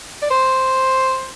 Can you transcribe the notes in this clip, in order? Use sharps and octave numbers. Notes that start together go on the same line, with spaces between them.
D5
C5